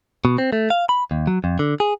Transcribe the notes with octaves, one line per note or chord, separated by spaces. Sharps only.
B2
C4
A3
F5
B5
D#2
F#3
F2
D3
G#4